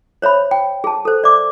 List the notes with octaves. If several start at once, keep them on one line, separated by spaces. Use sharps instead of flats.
C5 C#5 E5 B5
G5
G#4 A5
A4 C5
D5 E5 D6